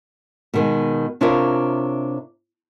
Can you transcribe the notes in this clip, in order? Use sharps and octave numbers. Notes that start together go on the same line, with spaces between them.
B2 D#3 G#3
C3 D4 E4 F4 A#4 C#5